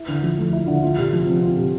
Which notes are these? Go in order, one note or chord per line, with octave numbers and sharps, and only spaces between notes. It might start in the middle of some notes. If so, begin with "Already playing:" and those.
Already playing: E4
D3
F3
A3
E4
D3
F4
C3
F3
C4
F4
C3